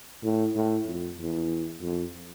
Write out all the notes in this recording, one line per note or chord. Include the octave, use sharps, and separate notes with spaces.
A2
A2
F2
E2
F2